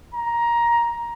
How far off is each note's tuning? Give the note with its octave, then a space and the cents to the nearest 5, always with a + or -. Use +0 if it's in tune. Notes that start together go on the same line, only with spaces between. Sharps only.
A#5 +15